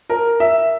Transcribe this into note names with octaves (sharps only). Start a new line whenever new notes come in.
A#4
E5